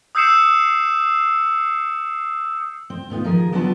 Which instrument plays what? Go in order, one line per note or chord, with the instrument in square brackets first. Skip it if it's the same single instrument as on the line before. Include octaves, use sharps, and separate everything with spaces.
[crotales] D#6 E6 G6 C7 C#7 E7
[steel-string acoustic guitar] C4
A2 B3 D#4 F4
D#3 F3 G#4 A#4
F#3 G3 B3 D4 F4 A5